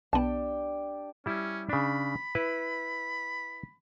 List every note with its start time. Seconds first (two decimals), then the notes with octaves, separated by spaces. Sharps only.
0.13 B1 B3 D4 G4 G5 A5
1.26 G3 C#4 E4
1.69 C#3 D4 B5
2.35 E4 B4